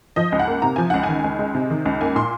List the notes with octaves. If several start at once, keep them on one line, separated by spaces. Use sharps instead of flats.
F3 D#5
C#2
F#5
A#3
C3 A#5
F3 G#5
C#2 F#5
G#5
D#3
C#2
G#3
C3
D#3
C#2
A#3 G#5
A#2 C6